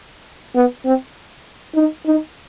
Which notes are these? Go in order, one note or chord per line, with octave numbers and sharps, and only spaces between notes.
B3
C4
D#4
D#4